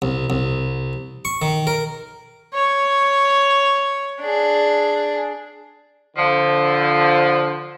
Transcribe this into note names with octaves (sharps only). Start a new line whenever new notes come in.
C2
C2
C#6
D#3
A#4
C#5
D4 G#4
D3 F3